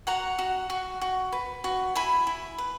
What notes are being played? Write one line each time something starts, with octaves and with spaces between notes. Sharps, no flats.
F#4 F#5 A#5
F#4
F#4
F#4
B4
F#4
E4 G#5 B5
E4
B4